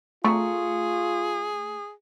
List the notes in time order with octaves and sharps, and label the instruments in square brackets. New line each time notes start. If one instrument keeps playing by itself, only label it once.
[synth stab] A3 [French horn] F4 [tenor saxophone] G#4 [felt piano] A#5 C#6